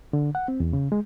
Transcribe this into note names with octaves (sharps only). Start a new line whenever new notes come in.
D3
F#5
C4
E2
C#3
G#3